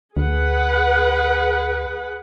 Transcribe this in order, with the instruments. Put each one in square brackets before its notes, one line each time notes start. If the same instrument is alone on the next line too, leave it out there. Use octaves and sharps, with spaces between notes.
[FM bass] D2 [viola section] G#4 B4 F#5